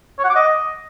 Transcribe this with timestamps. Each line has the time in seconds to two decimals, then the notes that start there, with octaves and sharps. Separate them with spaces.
0.18 C#5
0.24 F#5
0.30 D6
0.35 D#5